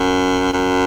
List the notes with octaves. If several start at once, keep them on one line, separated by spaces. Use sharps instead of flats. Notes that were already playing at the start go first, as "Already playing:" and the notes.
Already playing: F#2
F#2